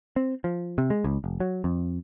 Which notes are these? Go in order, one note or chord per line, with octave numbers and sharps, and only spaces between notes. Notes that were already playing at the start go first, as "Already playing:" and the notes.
C4
F3
C3
G#3
C#2
F1
F#3
F2